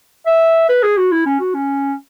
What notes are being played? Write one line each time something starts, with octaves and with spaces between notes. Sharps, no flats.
E5
B4
G#4
F#4
E4
C#4
F#4
C#4